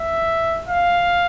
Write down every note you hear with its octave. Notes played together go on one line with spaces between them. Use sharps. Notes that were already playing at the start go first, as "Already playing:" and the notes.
Already playing: E5
F5